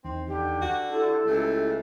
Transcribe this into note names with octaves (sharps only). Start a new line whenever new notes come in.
E2 D#3 C4
D3 G4
F#4
E4 G4 A4
C#2 A3